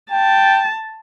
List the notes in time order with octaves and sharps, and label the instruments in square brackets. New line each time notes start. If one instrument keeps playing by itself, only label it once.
[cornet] G5 [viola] A5